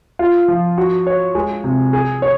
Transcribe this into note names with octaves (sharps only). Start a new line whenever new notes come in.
F4
F3
F#4
C#5
G#3
C3
G#4
C#5